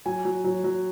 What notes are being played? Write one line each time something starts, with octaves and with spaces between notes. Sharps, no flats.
F#3 G#5
F#3
F#3
F#3